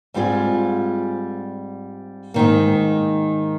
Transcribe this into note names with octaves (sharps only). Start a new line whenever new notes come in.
G#2 G3 C4 F4 G#4
G#2 D#3 A#3